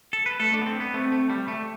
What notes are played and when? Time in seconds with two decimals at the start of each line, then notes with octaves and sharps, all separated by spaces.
0.13 A4
0.26 B4
0.39 A3 A4
0.54 D4
0.61 B3
0.66 C4
0.80 B3
0.94 A3 C4
1.12 A3
1.30 G3
1.48 A3